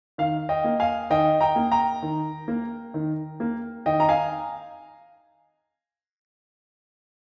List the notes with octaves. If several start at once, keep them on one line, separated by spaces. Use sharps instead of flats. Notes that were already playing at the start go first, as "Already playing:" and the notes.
D#3 F5
D#5 G5
A#3
F5 G#5
D#3 D#5 G5
G5 A#5
A#3
G5 A#5
D#3
A#3
D#3
A#3
D#3 D#5 G5
A#5
F5 G#5